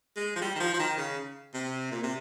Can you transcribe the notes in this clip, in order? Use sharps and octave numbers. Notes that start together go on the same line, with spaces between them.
G#3
F3
G3
D#3
F3
F3
D#3
C#3
C3
A#2
C3